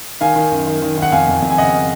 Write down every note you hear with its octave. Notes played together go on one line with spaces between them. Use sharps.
D#3 F5 G#5
D#3
F#2
D#3
D#3
D#3 F#5
F2 F5 G#5
F2
F2
G#5
C#3 D#5 F#5